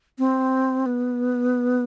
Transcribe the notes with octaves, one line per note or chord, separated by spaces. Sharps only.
C4
B3